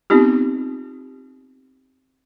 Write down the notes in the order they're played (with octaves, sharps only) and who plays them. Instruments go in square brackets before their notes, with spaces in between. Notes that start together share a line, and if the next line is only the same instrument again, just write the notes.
[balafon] B3 C4 D#4 F4 G4